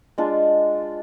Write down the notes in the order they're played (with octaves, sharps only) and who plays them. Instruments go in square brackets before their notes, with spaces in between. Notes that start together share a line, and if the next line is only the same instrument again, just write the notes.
[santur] G#3 D4 F4